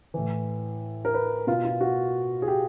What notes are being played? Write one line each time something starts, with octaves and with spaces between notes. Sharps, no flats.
A2 E3
A#4
B4
B2 F4
F4
F#4
G#4
G4